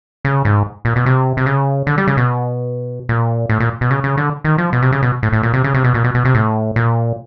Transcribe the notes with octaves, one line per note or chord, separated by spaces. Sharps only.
C#3
G#2
A#2
B2
C3
C3
C#3
D3
G3
C#3
B2
A#2
A2
A#2
B2
C#3
C#3
D3
D#3
F3
B2
C3
C#3
B2
A2
A2
A#2
C3
C#3
C3
B2
A#2
B2
B2
C3
A2
A#2